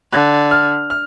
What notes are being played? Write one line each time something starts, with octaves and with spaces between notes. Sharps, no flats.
D3 F#6
F6
F6